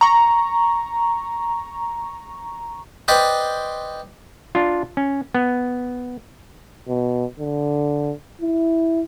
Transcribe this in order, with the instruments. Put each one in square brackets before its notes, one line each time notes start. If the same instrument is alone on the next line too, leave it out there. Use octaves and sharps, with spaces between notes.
[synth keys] A#5 C#6
[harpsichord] B4 C5 D5 D#5 G5 B5
[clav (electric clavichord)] D4 F4
C#4
B3
[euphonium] B2
D3
E4